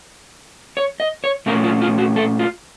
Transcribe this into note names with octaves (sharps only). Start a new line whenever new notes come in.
C#5
D#5
C#5
A#2 A3 C#4 A#4
F4
F4
F#4
A4
F4